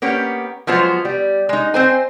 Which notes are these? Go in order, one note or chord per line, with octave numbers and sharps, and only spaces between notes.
A#3 B3 C#4 G4
F3 F#3 G#3 B3 F4 C5
G3
G#3 D#4
C4 C5 G#5